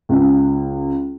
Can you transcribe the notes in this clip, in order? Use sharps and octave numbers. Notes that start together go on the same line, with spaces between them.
C#2